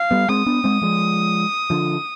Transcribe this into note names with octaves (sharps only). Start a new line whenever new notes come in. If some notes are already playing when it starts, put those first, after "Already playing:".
Already playing: F5
G3 B3
G#3 C4 D#6
B3 D4
G#3 C4
F3 G#3
D3 F3